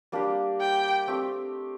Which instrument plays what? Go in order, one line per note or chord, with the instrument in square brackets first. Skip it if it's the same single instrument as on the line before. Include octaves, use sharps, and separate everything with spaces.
[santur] G3 A#3 D4 G4
[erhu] G5
[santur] A3 C4 G4